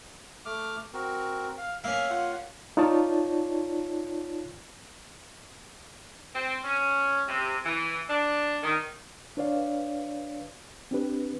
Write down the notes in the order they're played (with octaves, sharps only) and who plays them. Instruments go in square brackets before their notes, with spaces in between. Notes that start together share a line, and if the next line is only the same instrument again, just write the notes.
[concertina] A3 D6 F6
C4 F#4 A#4
F5
[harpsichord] A#3 C#4 [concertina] E5 F6
[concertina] F4 F#5
[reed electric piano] D#4 F4 C#5 D5 A5
[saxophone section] C4
C#4
C3
E3
D4
D#3
[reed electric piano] D4 B4 C#5 D5 F5
C4 D4 G4 B4